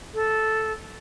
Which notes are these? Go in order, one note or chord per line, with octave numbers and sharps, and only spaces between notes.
A4